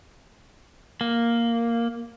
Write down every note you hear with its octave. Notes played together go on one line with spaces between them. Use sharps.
A#3